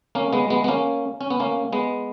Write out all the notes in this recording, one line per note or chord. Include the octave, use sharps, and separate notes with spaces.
A#3 C#4
G#3 B3
G#3 B3
B3
A#3 C#4
C#4
B3
A#3 C#4
G#3 B3